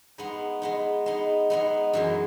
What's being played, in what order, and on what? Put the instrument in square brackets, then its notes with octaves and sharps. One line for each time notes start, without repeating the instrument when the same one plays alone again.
[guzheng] G#3 B3 D#4
G#3 B3 D#4
G#3 B3 D#4
G#3 B3 D#4
F#2 E3 G#3